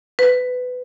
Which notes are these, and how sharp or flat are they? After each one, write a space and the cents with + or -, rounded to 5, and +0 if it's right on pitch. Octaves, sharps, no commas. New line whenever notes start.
B4 +20